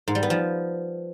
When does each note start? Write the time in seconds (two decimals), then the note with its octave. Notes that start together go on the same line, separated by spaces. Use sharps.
0.08 G#2
0.15 G3
0.23 B3
0.30 F3